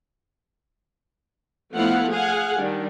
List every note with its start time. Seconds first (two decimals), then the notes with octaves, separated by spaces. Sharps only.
1.73 F3 A3 B3 E4 F5 F#5
2.11 G#4 F5 F#5 G#5
2.59 D#3 G3 D4